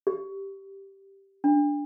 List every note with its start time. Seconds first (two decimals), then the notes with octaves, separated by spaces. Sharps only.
0.07 G4
1.44 D4